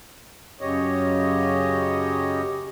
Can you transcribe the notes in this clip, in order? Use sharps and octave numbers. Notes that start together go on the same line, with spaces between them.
F#2 C#3 G4 C#5 D#5